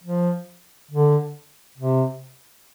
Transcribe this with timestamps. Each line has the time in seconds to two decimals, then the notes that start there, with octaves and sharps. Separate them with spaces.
0.03 F3
0.91 D3
1.78 C3